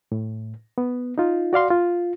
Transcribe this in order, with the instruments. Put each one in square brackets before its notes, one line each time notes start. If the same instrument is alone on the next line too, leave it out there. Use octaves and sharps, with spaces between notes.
[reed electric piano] A2
B3
D#4 F4
F#4 D5 F5 C6
F4